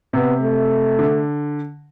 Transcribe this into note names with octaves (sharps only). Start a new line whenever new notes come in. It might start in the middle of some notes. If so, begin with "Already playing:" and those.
C3 B3
A3
D3